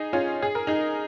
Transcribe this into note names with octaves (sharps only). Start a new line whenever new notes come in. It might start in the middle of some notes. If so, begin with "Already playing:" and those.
Already playing: D#4 G#4
C#4 F4
G#4
A#4
D#4 G#4